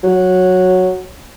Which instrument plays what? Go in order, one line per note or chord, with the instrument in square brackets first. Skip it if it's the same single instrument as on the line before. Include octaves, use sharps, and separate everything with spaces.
[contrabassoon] F#3